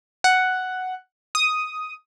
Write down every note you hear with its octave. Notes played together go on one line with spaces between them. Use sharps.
F#5
D#6